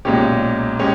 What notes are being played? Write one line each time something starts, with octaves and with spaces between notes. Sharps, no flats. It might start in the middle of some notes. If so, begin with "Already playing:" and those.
B1 A#2 G#3 C#4 G4
G#3 C#4 G4